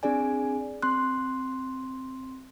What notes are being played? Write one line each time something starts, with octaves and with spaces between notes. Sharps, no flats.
C4 D4 G#4 D5 G#5
C4 C6 F#6